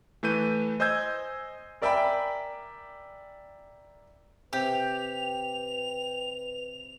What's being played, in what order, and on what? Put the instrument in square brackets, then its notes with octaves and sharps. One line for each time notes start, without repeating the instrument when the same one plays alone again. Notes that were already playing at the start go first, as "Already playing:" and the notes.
[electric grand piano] E3 A3 B4 G6 D#7
C5 D#5 G#5 E6 G6 G#6
[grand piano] A#4 D5 E5 G5 G#5 B5
[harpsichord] C3 [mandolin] G4 [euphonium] B4 [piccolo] F7